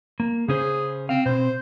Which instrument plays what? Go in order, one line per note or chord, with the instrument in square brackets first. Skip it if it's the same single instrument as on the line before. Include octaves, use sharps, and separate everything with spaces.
[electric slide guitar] A#3
[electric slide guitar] C#3 C#4 C5 [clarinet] G#4
[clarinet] C4 [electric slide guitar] F5
[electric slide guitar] B2 C4 [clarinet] C5